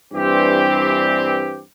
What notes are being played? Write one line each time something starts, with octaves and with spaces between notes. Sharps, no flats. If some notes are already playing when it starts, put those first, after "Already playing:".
G2 E3 C4 G4